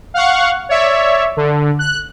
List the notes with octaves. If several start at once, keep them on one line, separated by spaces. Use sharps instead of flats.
F5 F#5 C#6
C#5 D5 E5
D3
F#6